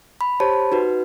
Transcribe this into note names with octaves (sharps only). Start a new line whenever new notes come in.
B5
G4 C5 C#5 A5 B5
D#4 F#4 B4